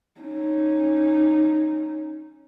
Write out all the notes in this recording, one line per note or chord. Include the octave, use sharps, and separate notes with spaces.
C#4 D#4